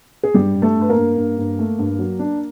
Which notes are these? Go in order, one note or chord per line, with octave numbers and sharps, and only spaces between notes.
G#4
G2 G3 G4
G2
A3 A4
G2
B4
A#3 A#4
G2
G2
G2
A3
G2
F#3
D4